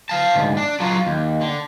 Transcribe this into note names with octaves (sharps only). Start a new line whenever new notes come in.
F5 A5
D2 G#2
D4
F#3 F4
D#2
D3